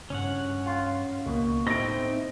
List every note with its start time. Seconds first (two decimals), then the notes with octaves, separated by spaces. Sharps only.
0.10 G2 C#3 C#4 C#5 F#5
0.66 F4
1.26 C#2 B2 A#3
1.67 A2 C4 D#4 E4 A#6 D7